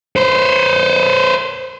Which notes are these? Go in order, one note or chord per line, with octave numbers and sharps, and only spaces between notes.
B4 C5